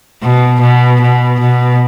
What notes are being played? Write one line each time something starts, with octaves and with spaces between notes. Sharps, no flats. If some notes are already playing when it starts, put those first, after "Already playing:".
B2
B2
B2
B2